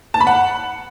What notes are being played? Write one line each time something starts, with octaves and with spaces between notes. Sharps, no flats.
A5
B5
F#5